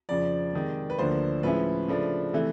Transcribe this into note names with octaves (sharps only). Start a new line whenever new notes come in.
F2 C#3 F3 D5
C3 D#3 G#3
B4
D2 D3 F3 A#3 D4 C5
A2 F3 G#3 C#4 E4 B4
C#3 F3 A3 D4
C3 E3 A3